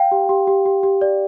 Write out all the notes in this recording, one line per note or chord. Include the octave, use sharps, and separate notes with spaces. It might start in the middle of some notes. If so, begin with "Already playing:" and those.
Already playing: F5 G5
G4
G4
G4
G4
G4
D5